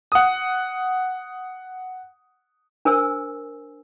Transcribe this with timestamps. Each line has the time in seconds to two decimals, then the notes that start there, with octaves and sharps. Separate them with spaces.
0.12 F#5 D#6
2.85 D4 A#4 C5 G#5 E6